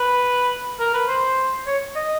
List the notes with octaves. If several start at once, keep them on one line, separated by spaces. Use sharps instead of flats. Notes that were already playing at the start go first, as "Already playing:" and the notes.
Already playing: B4
A#4
B4
C5
C#5
D#5